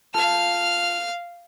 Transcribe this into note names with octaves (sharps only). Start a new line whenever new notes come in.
F4 A4 F5 A5 F6